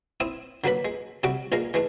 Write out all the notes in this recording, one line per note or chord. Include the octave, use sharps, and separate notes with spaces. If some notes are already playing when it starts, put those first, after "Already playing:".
C4 E4 D#6
D3 F#3 A#3 B4 B5
G#3
C3 G3 F#4 D6
A#1 A#2 G#3 F5 A#5
E3 G#3 A3